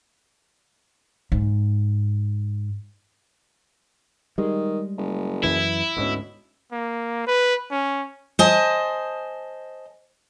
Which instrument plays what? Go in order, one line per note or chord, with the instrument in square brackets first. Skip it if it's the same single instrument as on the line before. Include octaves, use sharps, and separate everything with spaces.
[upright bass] G#2
[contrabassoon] D#3 [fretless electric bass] G3 G#3
[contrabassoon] F#1
[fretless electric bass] F#2 E3 [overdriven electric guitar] E4
[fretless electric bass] D2 G#2 C#4 [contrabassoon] B2
[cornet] A#3
B4
C#4
[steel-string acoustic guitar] C5 D#5 G#5 A5